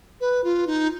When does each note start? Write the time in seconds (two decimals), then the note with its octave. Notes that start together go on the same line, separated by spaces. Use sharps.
0.20 B4
0.44 F4
0.67 D#4